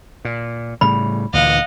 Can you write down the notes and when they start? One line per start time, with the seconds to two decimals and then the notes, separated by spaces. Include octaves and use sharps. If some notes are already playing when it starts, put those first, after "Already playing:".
0.25 A#2
0.81 A2 C#3 G3 B5
1.33 D2 A#2 E3 D#5 F5 F#5